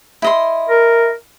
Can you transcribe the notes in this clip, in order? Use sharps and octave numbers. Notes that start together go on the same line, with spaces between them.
E4 D#5 C6
A#4